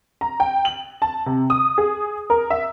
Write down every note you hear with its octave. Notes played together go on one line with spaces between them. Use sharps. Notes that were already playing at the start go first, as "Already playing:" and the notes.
A#5
G5
F#7
A5
C3
D#6
G#4
A#4
E5